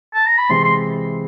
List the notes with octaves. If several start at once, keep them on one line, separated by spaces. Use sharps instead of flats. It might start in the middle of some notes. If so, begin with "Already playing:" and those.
A5
A#5
B5
C3 E3 G#3 C4 E4 C6
C6